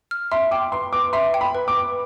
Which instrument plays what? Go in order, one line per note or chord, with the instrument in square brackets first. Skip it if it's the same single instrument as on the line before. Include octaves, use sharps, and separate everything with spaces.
[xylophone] F6
[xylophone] E5 [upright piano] C6
[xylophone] G5 [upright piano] D6
[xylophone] B4 [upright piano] C6
[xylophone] B4 [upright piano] D6
[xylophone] E5 [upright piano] C6
[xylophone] G5
[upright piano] B5
[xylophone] B4
[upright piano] D6
[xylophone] B4